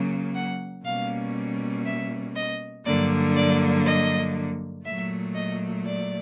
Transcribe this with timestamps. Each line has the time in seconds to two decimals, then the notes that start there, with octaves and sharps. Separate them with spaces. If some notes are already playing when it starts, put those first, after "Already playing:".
Already playing: C#3 F#3 A#3
0.35 F#5
0.84 B2 G3 A#3 C#4 F5
1.85 E5
2.35 D#5
2.85 G2 D3 F#3 A#3 D5
3.35 D5
3.85 D#5
4.85 A#2 F#3 A3 E5
5.34 D#5
5.85 D5